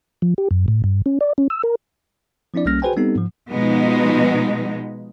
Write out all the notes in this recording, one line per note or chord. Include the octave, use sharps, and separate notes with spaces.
F3
G4
F#2
A2
G2
C#4
D5
C#4
E6
A#4
F3 C4 D4 E4 D5
B1 G3 A#3 C#4 F6 A#6
F#4 G#4 B4 C5 G5 G#5
G3 B3 C4 D#4 G4 A4
G#2 F3
B2 F3 G#3 B3 D#4